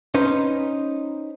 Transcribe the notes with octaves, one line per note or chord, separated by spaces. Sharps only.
C#4 D#4 B4 C5